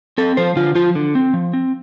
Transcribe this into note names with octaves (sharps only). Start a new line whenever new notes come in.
C4 A4
F3 C5
D3 F4
F3 F4
D3
C4
F3
C4